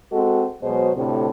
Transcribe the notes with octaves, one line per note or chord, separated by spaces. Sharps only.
G#3 C4 F#4 A4
B2 F#3 G#3 C5
D2 A2 C3